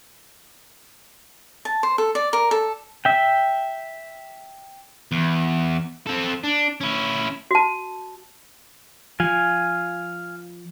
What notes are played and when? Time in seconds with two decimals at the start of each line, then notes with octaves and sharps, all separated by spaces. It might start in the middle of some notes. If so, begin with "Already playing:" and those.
1.65 A5
1.83 C5
1.98 A4
2.15 D5
2.33 A#4
2.51 A4
3.05 E5 G5
5.12 E2
6.07 C4 A4
6.44 D4
6.81 C#4 E4
7.51 F#4 A5
9.20 F3 F5 G#5